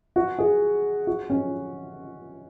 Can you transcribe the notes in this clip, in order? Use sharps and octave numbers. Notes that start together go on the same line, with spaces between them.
F#4
G#4
F#4
C#4